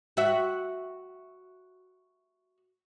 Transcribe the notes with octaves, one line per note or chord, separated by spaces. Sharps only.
F#4 E5